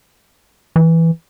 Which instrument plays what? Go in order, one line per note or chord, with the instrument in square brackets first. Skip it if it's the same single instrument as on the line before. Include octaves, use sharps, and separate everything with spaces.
[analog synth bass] E3